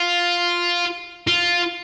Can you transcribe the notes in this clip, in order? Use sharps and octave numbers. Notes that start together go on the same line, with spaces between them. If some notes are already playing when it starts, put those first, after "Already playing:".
Already playing: F4
F4